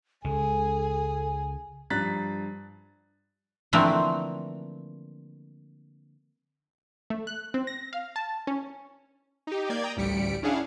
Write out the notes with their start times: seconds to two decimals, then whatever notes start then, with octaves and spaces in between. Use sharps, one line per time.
0.25 C#2 G#3 G#4 A4
1.90 G2 F3 A#5 F#6 A6 B6
3.73 D3 E3 F3 A3 A#3 C4
7.10 A3
7.27 F#6
7.54 C4
7.67 A#6
7.93 F5
8.16 A5
8.47 C#4
9.47 D#4 G4
9.69 A#3 D5 G6 G#6
9.83 G5 A#5 D#6
9.96 A1 D2 G3 B6 C#7 D7
10.43 C#4 D4 E4 G#4 F5 F#5